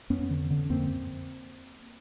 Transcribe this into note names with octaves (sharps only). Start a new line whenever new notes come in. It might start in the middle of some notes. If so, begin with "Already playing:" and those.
F2 B3 C#4
D3
D3
F2 A#3 C4
F2